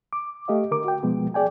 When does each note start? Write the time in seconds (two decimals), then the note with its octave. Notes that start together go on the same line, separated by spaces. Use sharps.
0.13 D6
0.48 A3 G4 D#5 F5
0.71 D3 A#4 D6
0.84 F#4 G5
1.03 B2 F3 G#3 B3
1.34 G#4 D5 G5 G#5